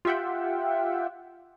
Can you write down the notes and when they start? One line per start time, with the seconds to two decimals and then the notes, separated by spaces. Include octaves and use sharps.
0.05 F4 G4 E5 F#5 G5